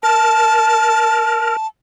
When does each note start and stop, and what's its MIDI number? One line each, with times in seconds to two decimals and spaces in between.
0.03 1.57 70
0.03 1.67 81